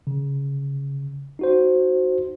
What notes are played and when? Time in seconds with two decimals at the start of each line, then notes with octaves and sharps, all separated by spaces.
0.07 C#3
1.39 D#4 F#4 C5